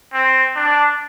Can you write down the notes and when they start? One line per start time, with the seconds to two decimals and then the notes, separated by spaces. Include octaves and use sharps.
0.13 C4
0.56 D4